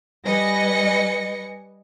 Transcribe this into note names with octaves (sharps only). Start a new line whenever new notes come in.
G3 B4 D#5 G#5 A#6 C#7